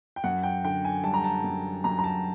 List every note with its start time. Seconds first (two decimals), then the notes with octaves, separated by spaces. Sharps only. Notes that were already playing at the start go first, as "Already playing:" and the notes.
0.16 G5
0.24 F#2 F#5
0.43 G5
0.64 D3 G5
0.85 G#5
1.04 G3 A5
1.14 A#5
1.24 A5
1.44 F#2
1.84 F#2 A#5
1.99 A#5
2.04 A5